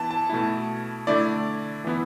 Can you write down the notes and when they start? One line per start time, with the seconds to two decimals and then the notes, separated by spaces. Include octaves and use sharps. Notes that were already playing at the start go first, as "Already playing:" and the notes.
Already playing: E3 B3 E4 A5
0.11 A5
0.30 B2 A3 E4
1.07 D3 A3 E4 D5
1.84 E3 B3 E4